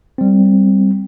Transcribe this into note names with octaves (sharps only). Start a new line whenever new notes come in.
G3 C4